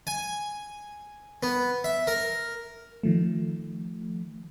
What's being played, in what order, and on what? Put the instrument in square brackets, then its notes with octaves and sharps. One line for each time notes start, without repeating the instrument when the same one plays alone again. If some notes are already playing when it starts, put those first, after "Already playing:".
[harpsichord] G#5
B3
E5
A#4
[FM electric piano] D#3 F3 A3